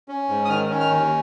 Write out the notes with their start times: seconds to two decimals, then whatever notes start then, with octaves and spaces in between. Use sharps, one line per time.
0.08 C#4
0.29 G#2
0.45 D#6
0.49 D#3 F6
0.70 C#4
0.80 F6
0.90 D#2